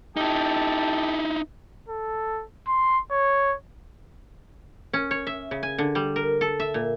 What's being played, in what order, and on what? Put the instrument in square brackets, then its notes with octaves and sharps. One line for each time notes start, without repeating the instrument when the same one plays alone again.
[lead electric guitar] D#4 E4 [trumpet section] G4 A4 A5
[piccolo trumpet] A4
C6
C#5
[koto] C#4
C#5
E5
C#3
G#5
D3
G3
A#4
A4
E5
A#2